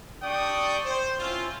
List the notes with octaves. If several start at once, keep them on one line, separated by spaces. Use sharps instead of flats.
D4 G4 D5 G5 C#6 D#6
C5
C4 C#4 E4 F4